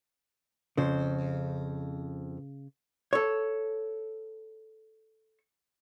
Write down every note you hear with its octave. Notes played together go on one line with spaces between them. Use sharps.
F2 C#3 C5
A4 C#5